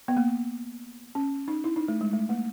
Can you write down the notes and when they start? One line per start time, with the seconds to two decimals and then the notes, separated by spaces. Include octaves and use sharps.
0.08 B3
0.17 A#3
1.15 C#4
1.48 D#4
1.64 E4
1.76 D#4
1.88 A3
2.01 G#3
2.13 A3
2.29 A#3